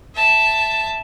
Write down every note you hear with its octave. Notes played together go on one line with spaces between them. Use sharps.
E5 A5